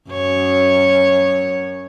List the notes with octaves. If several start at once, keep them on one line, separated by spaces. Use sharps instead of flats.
F#2 C#5